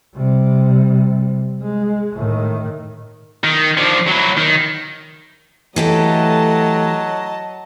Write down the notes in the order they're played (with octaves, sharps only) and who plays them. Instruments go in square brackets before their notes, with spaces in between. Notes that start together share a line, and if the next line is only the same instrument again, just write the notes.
[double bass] C3 G3
G#3
A2 D#3
[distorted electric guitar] D#3
F3 D4
F#3 E4
D#3
[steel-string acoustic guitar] E3 G4 A4 [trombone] F#3 [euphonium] A3 [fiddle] D#5 A5